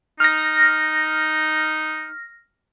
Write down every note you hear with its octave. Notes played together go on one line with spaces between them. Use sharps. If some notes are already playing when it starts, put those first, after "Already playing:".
D#4 F6 A#6